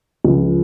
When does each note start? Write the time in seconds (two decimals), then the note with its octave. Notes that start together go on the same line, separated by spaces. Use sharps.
0.24 C#2 C#3 F3